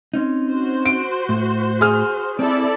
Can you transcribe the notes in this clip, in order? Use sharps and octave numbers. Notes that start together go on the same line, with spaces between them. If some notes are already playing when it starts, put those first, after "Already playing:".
C4 C#4 D#4
F#4 C5
D7
A2
G#4 F6
C4 E4 A4 D5